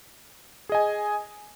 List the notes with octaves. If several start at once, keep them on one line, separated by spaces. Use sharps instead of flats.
G#4 D#5 G#5